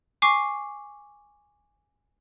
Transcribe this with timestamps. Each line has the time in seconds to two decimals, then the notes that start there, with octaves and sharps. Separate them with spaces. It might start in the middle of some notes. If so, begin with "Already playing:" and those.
0.22 G#5 C#6 D6 C7